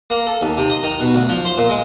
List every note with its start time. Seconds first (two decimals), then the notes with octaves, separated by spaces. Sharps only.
0.10 A#3
0.27 A4
0.41 D#2
0.57 C3
0.70 D#5
0.83 D#3
1.00 B2
1.15 D2
1.29 F3
1.45 C5
1.58 A#2
1.70 G#3